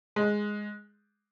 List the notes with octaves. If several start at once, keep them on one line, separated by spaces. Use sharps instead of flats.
G#3